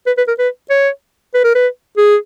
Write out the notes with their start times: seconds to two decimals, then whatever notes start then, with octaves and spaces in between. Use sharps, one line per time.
0.06 B4
0.17 B4
0.28 A#4
0.39 B4
0.70 C#5
1.34 B4
1.44 A#4
1.55 B4
1.97 G#4